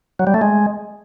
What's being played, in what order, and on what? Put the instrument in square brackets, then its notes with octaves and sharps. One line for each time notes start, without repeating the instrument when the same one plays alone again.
[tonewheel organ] F#3
G3
A3
G#3